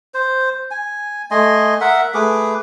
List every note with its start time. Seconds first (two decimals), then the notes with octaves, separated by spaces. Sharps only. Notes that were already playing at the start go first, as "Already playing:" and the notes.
0.14 C5
0.71 G#5
1.31 A3 D#5 G#5 C6
1.81 A#4 E5 F#5
2.14 A3 G#4 B4 D6